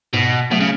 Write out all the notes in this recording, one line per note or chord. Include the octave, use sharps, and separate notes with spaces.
G#2 B2
B2 F#3 A3
C#3